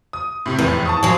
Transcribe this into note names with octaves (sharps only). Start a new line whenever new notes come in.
D#6
A2 C3
F1 E2 A2 B4
A5 C#6 D#6
F3 F#3